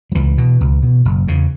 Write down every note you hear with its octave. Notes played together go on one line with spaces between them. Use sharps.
F#3
C#2 E3
B2
C#2
B2
F#1
E2 C#3